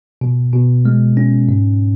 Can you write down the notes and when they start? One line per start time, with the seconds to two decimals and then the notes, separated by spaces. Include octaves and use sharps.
0.21 B2
0.53 B2
0.85 G#3
1.17 C#4
1.49 G#2